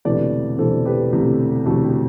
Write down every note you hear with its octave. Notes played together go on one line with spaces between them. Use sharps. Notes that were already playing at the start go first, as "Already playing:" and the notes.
E1 D2 C3 E3 A3 B4 D5
E1 D2 C3 E3 A3 A4 C5
G4 B4
E1 D2 C3 E3 A3
E1 D2 C3 E3 A3 F#4 A4
G4